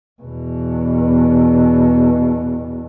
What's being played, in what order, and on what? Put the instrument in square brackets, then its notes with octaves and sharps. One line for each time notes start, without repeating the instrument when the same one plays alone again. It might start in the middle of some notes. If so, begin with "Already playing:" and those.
[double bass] E2 B2